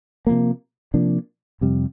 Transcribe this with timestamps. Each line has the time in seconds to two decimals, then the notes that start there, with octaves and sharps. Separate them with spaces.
0.27 C3 F3 A#3
0.94 C3 F3 A#3 D4
1.61 F2 C3 G3